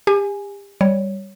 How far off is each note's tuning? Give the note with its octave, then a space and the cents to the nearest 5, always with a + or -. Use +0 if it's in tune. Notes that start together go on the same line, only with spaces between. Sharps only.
G4 +35 G#5 +0
G3 +0 C#5 +0